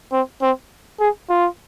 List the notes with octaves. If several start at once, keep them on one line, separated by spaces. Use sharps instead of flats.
C4
C4
G#4
F4